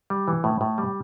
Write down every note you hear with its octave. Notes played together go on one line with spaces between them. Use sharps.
G3
E3
A2
A2
G3